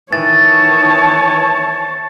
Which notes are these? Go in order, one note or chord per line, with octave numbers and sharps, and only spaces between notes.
D#3 E3 C#5 A5 A6